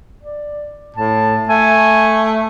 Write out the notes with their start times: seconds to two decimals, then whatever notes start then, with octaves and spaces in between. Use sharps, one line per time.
0.23 D5
0.96 A2 A5
1.49 A3 G#5